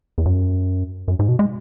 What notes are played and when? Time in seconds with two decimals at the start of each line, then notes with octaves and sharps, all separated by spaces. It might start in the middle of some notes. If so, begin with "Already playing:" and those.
0.18 E2
0.25 F#2
1.08 F#2
1.19 G#2
1.29 B2
1.39 G#3